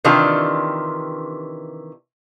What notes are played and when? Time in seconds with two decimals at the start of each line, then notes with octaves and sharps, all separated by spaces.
0.04 C3 D#3 E3 D4 F4 G4